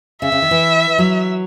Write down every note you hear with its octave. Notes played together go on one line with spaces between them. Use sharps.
C#3 E5
C#3
D#3
E3
F#3